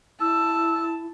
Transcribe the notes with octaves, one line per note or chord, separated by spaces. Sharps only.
E4 A5 E6